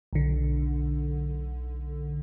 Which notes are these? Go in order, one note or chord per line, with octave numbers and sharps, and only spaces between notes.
B1 D3